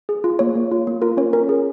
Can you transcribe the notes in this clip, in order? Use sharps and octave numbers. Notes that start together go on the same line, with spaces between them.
G#4
F4
A#3 C#5
A#3
F4
A#3
F4 A#4
C#4 C#5
C#4 A#4
G#4